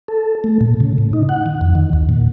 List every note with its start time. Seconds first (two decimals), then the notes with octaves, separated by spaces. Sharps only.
0.08 A4
0.44 A3
0.61 A#2
0.80 C#3
0.98 A2
1.13 D#4
1.29 F#5
1.46 D#3
1.61 F2
1.75 D#3
1.93 D#2
2.09 A#2